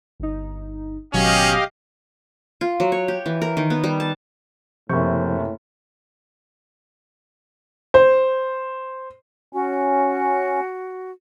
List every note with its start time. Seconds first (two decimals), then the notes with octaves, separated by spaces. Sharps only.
0.20 G1 D#4
1.13 G#1 B2 F#3 C#4 G4 D#5 F5
2.61 F4
2.80 F#3
2.92 C#5
3.08 G4
3.26 E3
3.42 A#4
3.57 D#3
3.70 B3
3.84 G3
4.00 A5
4.89 F#1 A2 C3 F3 C5 C#6 G6
7.94 C5
9.53 C#4 F#4